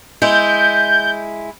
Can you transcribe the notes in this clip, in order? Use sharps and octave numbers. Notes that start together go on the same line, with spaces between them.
G#3 E4 G6